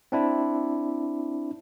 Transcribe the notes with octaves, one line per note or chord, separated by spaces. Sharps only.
C4 D4 E4